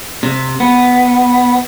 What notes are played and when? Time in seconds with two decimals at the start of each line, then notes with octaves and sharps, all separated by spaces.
0.23 C3
0.60 B3